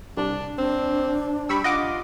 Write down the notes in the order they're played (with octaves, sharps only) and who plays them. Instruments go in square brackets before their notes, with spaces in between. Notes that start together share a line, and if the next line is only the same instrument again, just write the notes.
[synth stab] C2 [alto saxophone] D4
[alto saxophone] C4 [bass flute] D4
[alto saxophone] G3 [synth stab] B5 C#6 E6
[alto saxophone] F4 [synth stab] D#5 F#5 D6